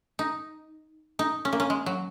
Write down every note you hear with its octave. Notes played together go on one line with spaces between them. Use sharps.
D#4
D#4
C#4
A#3
C#4
G#3
F#3